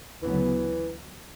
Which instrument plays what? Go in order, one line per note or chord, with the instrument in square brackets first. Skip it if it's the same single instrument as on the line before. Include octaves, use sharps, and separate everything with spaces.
[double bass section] D2 C#3 F#3 B3 [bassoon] E3